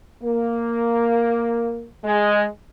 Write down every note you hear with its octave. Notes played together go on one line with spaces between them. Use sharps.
A#3
G#3